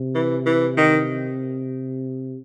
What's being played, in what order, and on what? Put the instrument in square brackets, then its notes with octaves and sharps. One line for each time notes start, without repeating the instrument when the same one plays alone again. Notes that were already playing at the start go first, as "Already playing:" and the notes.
Already playing: [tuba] C3
[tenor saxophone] E3
E3
D#3